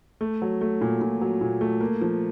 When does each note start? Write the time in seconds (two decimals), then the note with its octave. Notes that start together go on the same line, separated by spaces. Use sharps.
0.21 A3
0.42 F#3
0.61 A3
0.81 A#2
1.01 A#2
1.21 F#3
1.41 A#2
1.61 A3
1.81 A#3
2.01 F3